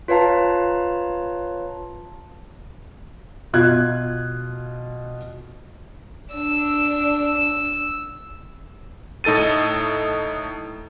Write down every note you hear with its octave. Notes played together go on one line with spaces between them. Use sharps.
F4 B4 C#5 F5 A5 A#5
B2 F4 F#6 G#6
D4 E6
A2 D#4 A4 A6 D#7